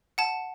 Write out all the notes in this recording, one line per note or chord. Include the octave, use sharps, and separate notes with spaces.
F#5 A5